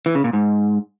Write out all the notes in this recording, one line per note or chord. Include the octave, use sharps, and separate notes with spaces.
E3
C#3
A#2
G#2